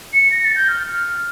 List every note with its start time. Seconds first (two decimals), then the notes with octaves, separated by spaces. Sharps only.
0.14 C#7
0.31 A#6
0.45 A6
0.56 G6
0.69 F6